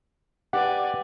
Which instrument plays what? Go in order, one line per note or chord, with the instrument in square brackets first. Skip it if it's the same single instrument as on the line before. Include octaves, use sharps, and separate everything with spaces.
[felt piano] G4 B4 [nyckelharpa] D5 G#5 [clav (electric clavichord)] F#5